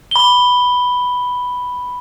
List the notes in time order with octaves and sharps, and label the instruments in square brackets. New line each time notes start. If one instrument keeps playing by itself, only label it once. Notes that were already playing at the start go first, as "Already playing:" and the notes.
[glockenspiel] B5 G7